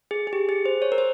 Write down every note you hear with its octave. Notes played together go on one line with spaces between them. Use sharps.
G#4
G#4
G4
G#4
C5
C#5
A#4
C5